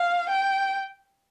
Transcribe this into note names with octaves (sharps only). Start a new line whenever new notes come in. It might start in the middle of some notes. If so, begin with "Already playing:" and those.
Already playing: F5
G5